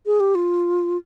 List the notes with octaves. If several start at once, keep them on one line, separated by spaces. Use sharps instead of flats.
G#4
G4
F4